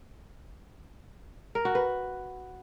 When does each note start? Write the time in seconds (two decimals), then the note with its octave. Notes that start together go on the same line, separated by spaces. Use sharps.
1.55 A#4
1.65 F#4
1.75 B4